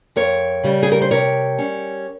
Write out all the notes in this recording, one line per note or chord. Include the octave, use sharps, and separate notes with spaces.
F2 A#4 C#5
C#3 G3
G#4
A#4
C5
C3 A#4 C#5
G3 C#4